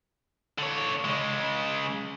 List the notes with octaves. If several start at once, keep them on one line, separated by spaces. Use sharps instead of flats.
D3 C#5
C#3 G#3